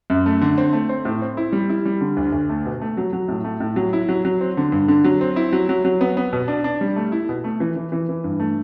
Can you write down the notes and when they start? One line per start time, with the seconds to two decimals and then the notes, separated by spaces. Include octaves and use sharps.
0.10 F#2
0.26 A3
0.41 D3
0.58 C4
0.73 A3
0.89 C4
1.05 A2
1.22 C4
1.37 E4
1.52 G3
1.69 E4
1.85 G3
2.01 D3
2.17 D2
2.32 D2
2.50 A3
2.66 B2
2.81 A3
2.97 F#3
3.13 F#3
3.28 A2
3.44 A3
3.60 A2
3.76 F#3
3.93 E4
4.09 F#3
4.25 F#3
4.41 C4
4.57 D3
4.72 G2
4.88 D3
5.04 F#3
5.21 C4
5.36 E4
5.53 F#3
5.69 F#3
5.85 F#3
6.01 B3
6.17 B3
6.33 B2
6.48 D4
6.64 D4
6.81 G3
6.96 A3
7.12 E4
7.29 B2
7.44 A3
7.60 E3
7.76 E3
7.92 E3
8.09 E3
8.24 G2
8.40 A3